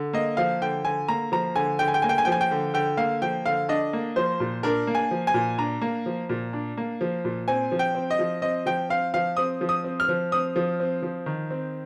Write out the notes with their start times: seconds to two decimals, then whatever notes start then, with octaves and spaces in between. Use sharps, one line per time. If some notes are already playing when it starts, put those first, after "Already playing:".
Already playing: D3
0.13 A#3 D#5
0.37 F3 F5
0.61 D3 G5
0.84 D3 G#5
1.08 A#3 A#5
1.32 F3 A#5
1.55 D3 G#5
1.79 D3 G5
1.88 G#5
1.94 G5
2.02 A#3 G#5
2.09 G5
2.18 G#5
2.25 F3 G5
2.32 G#5
2.41 G5
2.51 D3
2.74 D3 G5
2.97 A#3 F5
3.22 F3 G5
3.45 D3 F5
3.69 D4 D#5
3.93 A#3
4.16 F3 C5
4.40 A#2
4.63 D4 A#4
4.87 A#3
4.95 G#5
5.11 F3
5.27 G#5
5.34 A#2
5.58 D4 A#5
5.81 A#3
6.06 F3
6.29 A#2
6.53 D4
6.77 A#3
7.01 F3
7.25 A#2
7.48 C4 G#5
7.72 F3
7.79 G5
7.95 C4
8.11 D#5
8.19 F3
8.42 C4 D#5
8.66 F3 G5
8.89 C4 F5
9.14 F3 F5
9.37 C4 D#6
9.61 F3
9.69 D#6
9.84 C4
10.00 F6
10.09 F3
10.32 C4 D#6
10.56 F3
10.80 C4
11.02 F3
11.26 D#3
11.50 C4